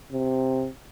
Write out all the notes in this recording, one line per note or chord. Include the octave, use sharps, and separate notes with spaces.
C3